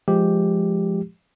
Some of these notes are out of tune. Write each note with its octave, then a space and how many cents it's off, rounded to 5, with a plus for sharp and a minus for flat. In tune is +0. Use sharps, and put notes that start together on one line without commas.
F3 +0 G#3 +10 G4 +0